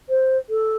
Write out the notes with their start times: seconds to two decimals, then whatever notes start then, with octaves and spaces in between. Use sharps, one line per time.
0.09 C5
0.49 A4